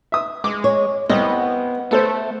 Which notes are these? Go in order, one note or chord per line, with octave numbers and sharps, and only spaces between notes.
E5 D#6
G#3 D6
C#5
C2 B3 D#5
A3 B3 A4 C5